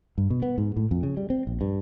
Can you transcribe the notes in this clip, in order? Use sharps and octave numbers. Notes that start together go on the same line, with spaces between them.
G2
B2
B3
G#2
A2
F2
C#3
G3
C4
A#1
G2